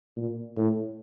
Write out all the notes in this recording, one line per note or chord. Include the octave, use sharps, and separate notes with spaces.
A#2
A2